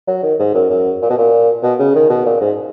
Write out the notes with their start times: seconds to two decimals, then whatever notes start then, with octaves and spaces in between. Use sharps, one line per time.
0.07 F#3
0.23 D#3
0.39 G#2
0.54 F#2
0.70 F#2
1.02 A#2
1.10 B2
1.18 A#2
1.63 B2
1.79 C#3
1.95 D#3
2.10 B2
2.25 A#2
2.41 G#2